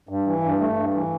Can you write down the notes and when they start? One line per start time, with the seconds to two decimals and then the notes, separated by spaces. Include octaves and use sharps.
0.09 G2
0.27 E3
0.43 G2
0.60 A3
0.77 G2
0.94 E3